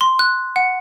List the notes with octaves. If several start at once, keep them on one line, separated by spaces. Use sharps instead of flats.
C6
F#6
F#5